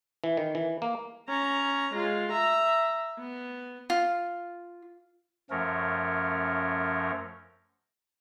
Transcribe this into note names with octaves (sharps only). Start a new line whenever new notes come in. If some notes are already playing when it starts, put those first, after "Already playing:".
E3
D#3
E3
A#3
C#4 A#5
G#3 F4
E5 A#5
B3
F4
F#2 F3 A3 C#4 A#4